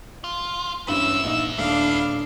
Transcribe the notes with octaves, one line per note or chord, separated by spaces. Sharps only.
F4
G2 B3 C#4 E4 E6
A#1 D#4
D#1 D4 F5